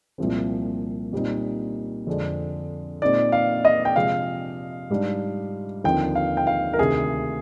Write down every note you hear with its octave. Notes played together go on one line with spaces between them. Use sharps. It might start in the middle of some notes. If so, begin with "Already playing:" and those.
C2 A#2 F3 G#3 C4
A#2 G3 C4 D#4
F2 D3 G#3 D4
A#2 G#3 C4 D#4 D5
F5
D#5
G5
C3 F3 G#3 F5
G#2 G3 D4
D#2 D3 F3 C4 D#4 G5
F5
G5
F5
A#4
D2 C3 D#3 G#4